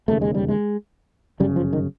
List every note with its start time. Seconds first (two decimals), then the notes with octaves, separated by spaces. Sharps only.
0.08 E1 D#2 C#3 A3
0.21 G#3
0.35 G3
0.48 G#3
1.40 G1 F#2 C#3 G3
1.56 F3
1.73 D#3